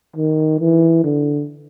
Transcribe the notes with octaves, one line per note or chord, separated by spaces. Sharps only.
D#3
E3
D3